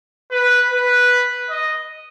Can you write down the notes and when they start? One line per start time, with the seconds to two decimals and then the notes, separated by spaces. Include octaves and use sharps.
0.31 B4
0.71 B4
1.50 D#5